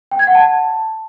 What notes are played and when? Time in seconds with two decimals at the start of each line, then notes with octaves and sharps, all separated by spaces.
0.11 G5
0.19 G#6
0.27 F#5
0.35 A5